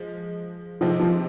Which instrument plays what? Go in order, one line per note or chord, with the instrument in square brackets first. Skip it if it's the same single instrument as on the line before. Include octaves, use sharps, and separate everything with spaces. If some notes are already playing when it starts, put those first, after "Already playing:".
Already playing: [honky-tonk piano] F3 G#3
[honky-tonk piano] C3 D#3 G#3 C4 D#4 [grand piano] F3
[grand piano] F3